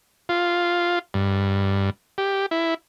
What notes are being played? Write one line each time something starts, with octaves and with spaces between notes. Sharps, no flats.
F4
G2
G4
E4